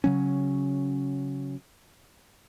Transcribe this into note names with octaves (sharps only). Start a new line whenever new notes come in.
C#3 F#3 C#4